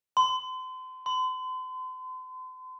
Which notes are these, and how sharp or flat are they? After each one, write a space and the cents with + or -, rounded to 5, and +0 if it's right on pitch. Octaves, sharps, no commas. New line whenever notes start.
C6 -35
C6 -40